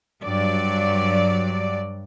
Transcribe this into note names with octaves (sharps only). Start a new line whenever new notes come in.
G2 F#3 D5